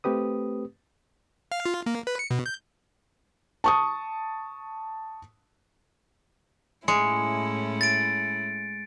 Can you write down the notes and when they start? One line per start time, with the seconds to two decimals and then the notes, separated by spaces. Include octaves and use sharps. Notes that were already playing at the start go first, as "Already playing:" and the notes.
0.04 A3 C4 G4 B4 D#6
1.52 F5
1.66 F4
1.86 A#3
2.07 B4
2.19 C#7
2.31 B2
2.46 G6
3.64 A5 C#6 D#6
6.88 A2 G#3 C#4 E4 C#7
7.81 A6 D7